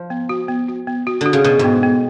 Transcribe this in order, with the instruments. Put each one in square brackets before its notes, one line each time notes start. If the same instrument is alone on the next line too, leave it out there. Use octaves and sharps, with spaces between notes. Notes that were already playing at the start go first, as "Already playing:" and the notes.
Already playing: [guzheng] F3
[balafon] B3
F#4
B3
F#4
B3
F#4
[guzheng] D3 [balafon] F#4
[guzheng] C#3
[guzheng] B2 [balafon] F#4
[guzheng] G#2
[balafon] B3
B3